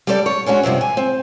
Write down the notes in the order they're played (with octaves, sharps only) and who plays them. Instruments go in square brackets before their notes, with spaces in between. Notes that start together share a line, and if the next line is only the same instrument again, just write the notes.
[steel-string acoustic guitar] G3 G4 A4 C5 D5
C#5
G#3 C#4 D4 F#4
G2 C3 F3 C4
G#5
C4